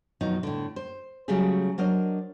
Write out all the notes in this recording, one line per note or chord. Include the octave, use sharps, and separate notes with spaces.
B2 D#3 F3 F#3 D#4
A2 D3
C5
C#3 F#3 G3 A3 G4 G#4
F#3 D4 A#4 C5 D#5